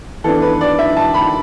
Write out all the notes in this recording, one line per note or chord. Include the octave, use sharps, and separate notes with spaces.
E3 B3 D4 A4
B4
D5
E5
A5
B5